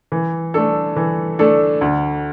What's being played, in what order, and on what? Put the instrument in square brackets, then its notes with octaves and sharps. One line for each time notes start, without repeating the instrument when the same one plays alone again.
[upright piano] E3
A3 D4 A4
E3
A3 D4 A4
D2